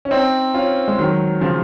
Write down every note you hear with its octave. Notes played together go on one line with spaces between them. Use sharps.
C#4
C4 D#4
C#4 F4
G#3
D#3 F#3
C#3 F3